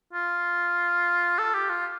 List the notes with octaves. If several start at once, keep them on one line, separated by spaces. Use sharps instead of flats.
F4
A4
G4
F4